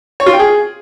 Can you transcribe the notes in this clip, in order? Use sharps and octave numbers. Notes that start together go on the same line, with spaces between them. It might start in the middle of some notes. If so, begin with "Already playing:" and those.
C#5
F4
G5
G#4